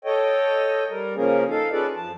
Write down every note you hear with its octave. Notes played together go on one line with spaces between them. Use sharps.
A4 C#5 D#5 G5
G3 A#4
C#3 F3 A#3 C#4 G#4 A#4
D#4 A4 F5
C#4 F4 G#4 A4 B4 D5
F2 F3 A5